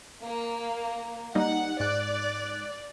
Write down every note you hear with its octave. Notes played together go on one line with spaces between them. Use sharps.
A#3
G3 A#3 D#4 F#5
G#2 D5 F#6